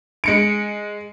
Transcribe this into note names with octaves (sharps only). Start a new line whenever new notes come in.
G#3 C#7 D7